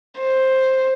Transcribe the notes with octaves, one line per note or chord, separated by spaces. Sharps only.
C5